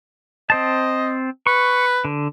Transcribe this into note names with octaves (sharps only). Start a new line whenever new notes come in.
C4 C5 D#5 A5
B4 C#6
D3